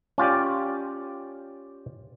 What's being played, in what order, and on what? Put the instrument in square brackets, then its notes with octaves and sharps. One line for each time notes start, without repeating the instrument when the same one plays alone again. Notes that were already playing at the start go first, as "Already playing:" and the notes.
[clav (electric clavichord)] C#4 F4 G4 D5